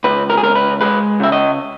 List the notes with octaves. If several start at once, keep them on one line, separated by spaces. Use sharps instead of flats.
C#2 B4
A#4
G#4
C#2 A#4
B4
G#3 B4
C#3 E5
D#5